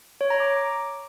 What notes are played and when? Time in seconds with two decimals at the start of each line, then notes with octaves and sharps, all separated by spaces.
0.21 C#5
0.30 A#5
0.40 D6